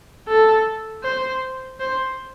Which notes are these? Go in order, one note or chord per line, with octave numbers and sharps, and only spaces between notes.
A4
C5
C5